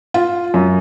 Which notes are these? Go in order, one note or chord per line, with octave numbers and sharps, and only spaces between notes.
F4
F#2